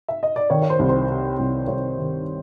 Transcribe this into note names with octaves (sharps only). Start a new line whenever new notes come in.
E5
D#5
D5
D#3 C#5
C#5
C5
C2
C5
C3
C2
C2 C#5
D#3